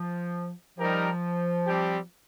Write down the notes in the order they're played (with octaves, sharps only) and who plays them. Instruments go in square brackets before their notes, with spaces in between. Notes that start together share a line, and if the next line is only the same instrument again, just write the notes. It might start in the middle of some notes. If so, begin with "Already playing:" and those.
Already playing: [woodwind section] F3
[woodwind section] F3 [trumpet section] G3 D#4 G4 A#4
[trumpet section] G3 C4 G4